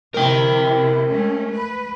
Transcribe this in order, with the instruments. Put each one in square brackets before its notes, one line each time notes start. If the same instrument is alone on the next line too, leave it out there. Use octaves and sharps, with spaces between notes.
[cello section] C3 E4 [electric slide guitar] A#4 G5
[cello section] G#3 A3 C#4
B4